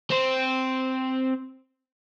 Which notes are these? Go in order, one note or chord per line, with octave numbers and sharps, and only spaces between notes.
C4 C5